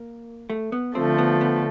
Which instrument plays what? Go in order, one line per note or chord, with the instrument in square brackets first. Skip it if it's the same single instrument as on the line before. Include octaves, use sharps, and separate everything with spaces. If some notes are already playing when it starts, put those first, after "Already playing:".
Already playing: [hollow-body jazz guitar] A#3
A3
B3
[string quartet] D3 F3 A3 [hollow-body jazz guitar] C4
[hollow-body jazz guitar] B3
B3